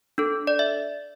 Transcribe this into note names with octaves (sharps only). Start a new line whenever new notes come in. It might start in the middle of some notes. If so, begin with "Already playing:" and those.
D4 A4
D5
E5